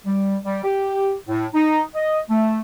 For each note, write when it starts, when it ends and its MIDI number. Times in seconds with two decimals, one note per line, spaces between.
0.06 0.37 55
0.45 0.62 55
0.64 1.15 67
1.28 1.46 45
1.54 1.83 63
1.95 2.19 75
2.30 2.61 57